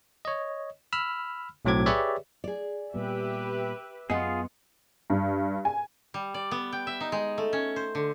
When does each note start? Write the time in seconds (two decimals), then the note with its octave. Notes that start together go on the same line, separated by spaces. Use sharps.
0.25 C#5 D#5
0.93 B5 E6 F6
1.65 B1 A2 F#3 C4 D6 G#6
1.86 G4 G#4 B4 C#5 D5 E5
2.44 G#4 D5
2.94 A#2 G3 B3 G4 B4 E5
4.10 F#2 B3 F4 G#4 D#5 F#5
5.10 G2
5.65 G#5
6.14 G3
6.34 D5
6.51 B3
6.73 G5
6.87 E5
7.00 D#4
7.12 G#3
7.38 A3
7.53 C#4
7.76 C5
7.95 D3